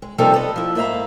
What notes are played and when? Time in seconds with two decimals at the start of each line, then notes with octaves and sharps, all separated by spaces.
0.02 G#3
0.18 C3 F3 G3 A#3 D#4 A4
0.34 B3 A4 D#5
0.56 F3 E4
0.75 G#2 A#3 E4 E5 F5 A#5